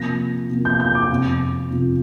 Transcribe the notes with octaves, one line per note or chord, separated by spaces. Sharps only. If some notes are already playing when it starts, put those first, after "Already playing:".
Already playing: C3 F3 A#3 A#6
C3 F3 A#3
G6
G6
D6
F2 C3 F3
F2 C3 F3